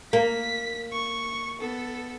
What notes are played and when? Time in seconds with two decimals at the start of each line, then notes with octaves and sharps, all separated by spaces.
0.13 A#3 B6
0.92 C#6
1.60 B3 A4